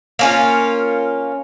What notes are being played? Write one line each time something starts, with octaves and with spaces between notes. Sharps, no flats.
A#3 C#4 F4